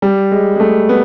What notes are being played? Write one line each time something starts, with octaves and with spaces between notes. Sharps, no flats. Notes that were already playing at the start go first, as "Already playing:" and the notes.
G3
G#3
G#3
A3
B3